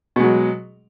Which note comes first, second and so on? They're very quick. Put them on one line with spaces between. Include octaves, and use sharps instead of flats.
B2 G#3 F#3